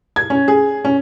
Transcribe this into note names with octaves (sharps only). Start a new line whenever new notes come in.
G#6
C#4
G#4
C#4